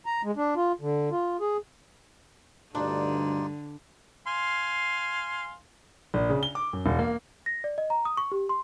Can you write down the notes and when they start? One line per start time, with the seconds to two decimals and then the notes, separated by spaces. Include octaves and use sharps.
0.06 A#5
0.23 G#3
0.36 D4
0.56 F4
0.81 D3
1.11 F4
1.41 G#4
2.75 D2 G2 D3 D4 D#4 F4 D5
4.27 F5 G#5 C6
6.14 A#1
6.29 C#3
6.43 G7
6.55 D6
6.73 F#2
6.86 E1
6.99 A#3
7.46 A#6
7.64 D5
7.78 D#5
7.90 A#5
8.05 D#6
8.17 C#6
8.32 G4
8.49 C6